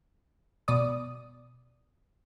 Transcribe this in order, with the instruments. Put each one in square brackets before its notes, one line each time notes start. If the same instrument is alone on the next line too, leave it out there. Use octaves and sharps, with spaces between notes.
[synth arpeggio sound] B2 D5 D#6